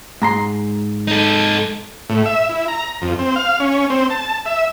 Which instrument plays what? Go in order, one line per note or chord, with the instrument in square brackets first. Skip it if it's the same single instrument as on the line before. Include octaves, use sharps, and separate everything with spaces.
[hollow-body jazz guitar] G#2 A#5 C6
[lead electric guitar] D#4 A4
[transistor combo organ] A2
E5
E4
A#5
F2
C4
F5
C#4
C4
A5
E5